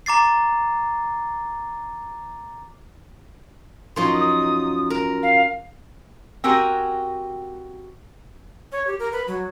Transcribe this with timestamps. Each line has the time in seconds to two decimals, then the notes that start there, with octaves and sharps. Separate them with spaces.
0.06 A#5 D6 A6 C7
3.96 F#2 F3 D#4 C6
4.14 D#6
4.90 A#4
5.23 F5
6.44 C4 F#4 G4 A#4 G#5
8.72 C#5
8.87 G4
8.99 A#4
9.12 B4
9.28 F#3